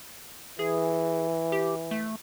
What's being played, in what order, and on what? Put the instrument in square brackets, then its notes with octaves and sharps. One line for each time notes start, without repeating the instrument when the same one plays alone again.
[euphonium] E3 [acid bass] G#4
[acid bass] G4
A3